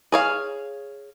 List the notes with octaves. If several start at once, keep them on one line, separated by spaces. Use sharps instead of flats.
G#4 C#5 F5